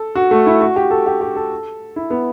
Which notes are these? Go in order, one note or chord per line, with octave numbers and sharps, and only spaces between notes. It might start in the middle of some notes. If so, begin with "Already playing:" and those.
Already playing: A4
F#4
A3
E4
F#4
G4
A4
G4
G4
A4
E4
B3